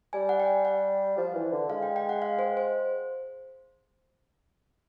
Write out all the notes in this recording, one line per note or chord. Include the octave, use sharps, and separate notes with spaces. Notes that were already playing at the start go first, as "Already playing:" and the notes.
G3 G#5
F#5
G5
F#5
F3
E3
D3
G#3 F5
G5
G5
F#5
F5
C5
C5